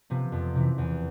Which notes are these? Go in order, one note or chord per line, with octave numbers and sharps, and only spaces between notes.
C3 F3 B3
F2
C3 E3
E2